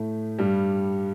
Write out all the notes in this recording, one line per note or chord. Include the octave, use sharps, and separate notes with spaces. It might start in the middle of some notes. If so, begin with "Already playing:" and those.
Already playing: A2 A3
G2 G3